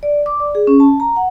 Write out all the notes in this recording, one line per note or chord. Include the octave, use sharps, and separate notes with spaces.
D5
D6
D5
G#4
C#4
A5
A#5
F#5